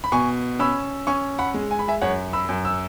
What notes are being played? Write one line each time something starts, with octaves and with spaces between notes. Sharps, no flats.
B5
B2 G#5 C#6
C#4 B5 E6
C#4 G#5 C#6
F#5 B5
G#3
G#5
B5
E5 G#5
F#2 C#5 F#5
B5 E6
F#2
E6